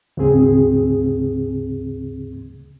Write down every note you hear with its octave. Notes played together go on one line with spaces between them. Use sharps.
D2 G#2 C#3 C4 G#4